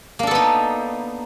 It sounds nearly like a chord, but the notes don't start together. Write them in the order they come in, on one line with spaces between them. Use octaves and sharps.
A#3 D4 A4 B3 D#4